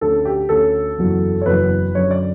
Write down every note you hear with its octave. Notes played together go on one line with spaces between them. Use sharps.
D2 D3 A3 C#4 A4
G4
D2 D3 A3 C#4 A4
F#1 E2 C#3 F#3
C#5
F#1 E2 C#3 F#3 B4
F#2 D3 F#3 C#4 C#5
D5